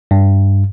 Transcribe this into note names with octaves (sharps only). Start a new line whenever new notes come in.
G2